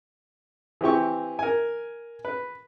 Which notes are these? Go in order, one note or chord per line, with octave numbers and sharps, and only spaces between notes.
E3 C4 G4 C#6
A#4 G#5
B4